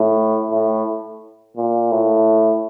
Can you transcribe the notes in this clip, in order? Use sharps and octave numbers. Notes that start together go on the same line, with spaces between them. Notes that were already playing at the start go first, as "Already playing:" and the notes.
Already playing: A2
A2
A#2
A2